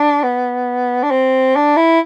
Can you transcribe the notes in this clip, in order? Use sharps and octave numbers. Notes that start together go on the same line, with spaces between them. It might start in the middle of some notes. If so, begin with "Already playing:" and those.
Already playing: D4
B3
D4
C4
D4
E4